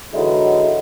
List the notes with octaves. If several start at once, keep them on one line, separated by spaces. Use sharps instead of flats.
D3 E3 F#3 G#3 D#4 E4